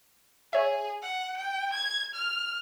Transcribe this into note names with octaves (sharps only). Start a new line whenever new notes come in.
G#4 C#5 E5
F#5
G5
G#6
F6